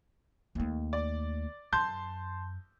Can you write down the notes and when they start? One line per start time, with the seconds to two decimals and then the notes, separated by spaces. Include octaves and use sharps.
0.55 D#2 A3
0.93 D5
1.72 F#2 A5 C6 G6